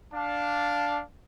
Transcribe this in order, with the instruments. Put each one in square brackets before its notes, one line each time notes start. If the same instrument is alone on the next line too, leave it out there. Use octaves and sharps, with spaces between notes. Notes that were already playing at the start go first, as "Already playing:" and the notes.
[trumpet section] D4 F5 [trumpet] A5